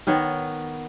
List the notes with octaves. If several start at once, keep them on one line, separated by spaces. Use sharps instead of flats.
D#3 B3 C#5